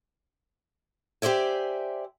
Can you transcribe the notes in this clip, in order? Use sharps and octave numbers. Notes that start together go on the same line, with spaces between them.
G4 C5 D5 E5 G#5